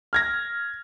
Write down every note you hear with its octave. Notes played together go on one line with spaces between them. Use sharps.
F6 G#6 A#6